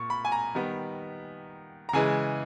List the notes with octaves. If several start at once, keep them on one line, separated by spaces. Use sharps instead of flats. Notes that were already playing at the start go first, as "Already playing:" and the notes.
Already playing: A#2 C#6
B5
G#5
A#5
D#3 G3 B3
A#5
C#3 E3 G#3 G#5